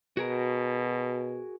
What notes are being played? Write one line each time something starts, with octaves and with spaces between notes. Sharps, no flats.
B2 F#4 G#4 A#4